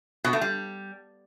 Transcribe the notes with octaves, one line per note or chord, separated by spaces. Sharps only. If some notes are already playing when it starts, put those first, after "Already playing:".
B2
A3
G3